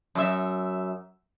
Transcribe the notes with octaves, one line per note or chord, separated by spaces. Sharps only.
F#2 E5